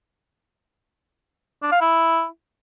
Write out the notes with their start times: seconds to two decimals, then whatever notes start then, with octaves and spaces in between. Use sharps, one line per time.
1.62 D4
1.72 F5
1.81 E4